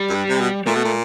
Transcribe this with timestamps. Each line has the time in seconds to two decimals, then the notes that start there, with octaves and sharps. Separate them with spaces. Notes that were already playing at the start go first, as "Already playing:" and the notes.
Already playing: G3
0.09 F#2
0.15 G2
0.29 C3
0.40 B2
0.66 A#2 A3
0.76 B2
0.85 A#2